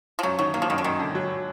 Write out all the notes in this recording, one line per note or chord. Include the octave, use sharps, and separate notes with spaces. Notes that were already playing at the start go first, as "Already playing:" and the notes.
F3
F#2 F#3
D#3 F#3
F#3 A#3
F3
F#2 D#3
D3
F#2 D#3
D3
F#3